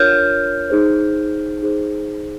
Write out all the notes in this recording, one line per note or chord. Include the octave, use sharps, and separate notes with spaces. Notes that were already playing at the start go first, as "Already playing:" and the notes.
Already playing: D4 F4 A#4 C#5 F6 G6
D#4 G#4 C5
D#4 G#4 C5